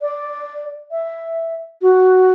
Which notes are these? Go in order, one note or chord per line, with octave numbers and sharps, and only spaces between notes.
D5
E5
F#4